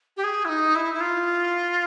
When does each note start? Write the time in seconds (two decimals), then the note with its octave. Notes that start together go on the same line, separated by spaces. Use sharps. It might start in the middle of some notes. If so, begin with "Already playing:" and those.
0.16 G4
0.23 G#4
0.44 E4
0.48 D#4
0.75 E4
0.94 E4
1.00 F4